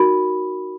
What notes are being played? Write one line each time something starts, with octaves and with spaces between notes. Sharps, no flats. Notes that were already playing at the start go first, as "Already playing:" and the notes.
Already playing: D#4 F#4 A#4 B5